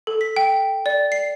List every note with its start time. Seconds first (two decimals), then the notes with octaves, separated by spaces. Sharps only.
0.07 A4
0.21 B6
0.36 G5
0.86 D5
1.12 C7